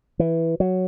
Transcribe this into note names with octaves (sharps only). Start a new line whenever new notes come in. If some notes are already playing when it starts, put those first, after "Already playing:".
E3
F#3